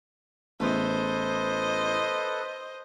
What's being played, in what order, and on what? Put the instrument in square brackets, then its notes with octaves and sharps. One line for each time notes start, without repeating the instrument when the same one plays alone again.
[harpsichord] A1 E2 [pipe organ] A4 B4 [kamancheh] C5 D#5